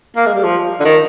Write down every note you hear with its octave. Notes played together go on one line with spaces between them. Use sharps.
A#3
G#3
G3
F3
D3
D#3